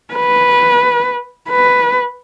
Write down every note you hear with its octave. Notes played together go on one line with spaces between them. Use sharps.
B4
B4